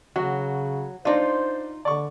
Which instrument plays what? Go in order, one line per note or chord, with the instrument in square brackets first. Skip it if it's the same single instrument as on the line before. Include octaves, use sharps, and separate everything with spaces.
[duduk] C#3 [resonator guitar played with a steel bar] F#3 [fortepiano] F#4
[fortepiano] D4 D5 [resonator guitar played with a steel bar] D#4 F4 [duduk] C5
[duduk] D3 [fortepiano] D5 C#6